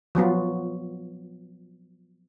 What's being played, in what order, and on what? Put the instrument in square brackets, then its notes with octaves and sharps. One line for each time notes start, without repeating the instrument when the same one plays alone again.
[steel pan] F3 F#3 B3 F4